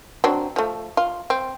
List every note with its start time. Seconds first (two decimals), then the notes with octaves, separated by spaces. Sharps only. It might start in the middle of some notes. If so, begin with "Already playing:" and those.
0.24 F#3 C4 D4
0.56 F3 A3
0.97 F4
1.30 C4